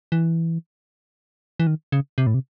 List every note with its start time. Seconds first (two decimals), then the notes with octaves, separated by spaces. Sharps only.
0.12 E3
1.60 E3
1.67 D#3
1.92 C#3
2.18 C3
2.27 A2
2.34 C3